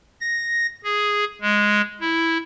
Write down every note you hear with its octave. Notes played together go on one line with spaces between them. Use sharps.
A#6
G#4
G#3
E4